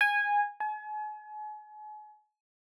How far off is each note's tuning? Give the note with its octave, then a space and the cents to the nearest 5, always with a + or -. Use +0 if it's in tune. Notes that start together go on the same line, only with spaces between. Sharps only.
G#5 -15
G#5 +40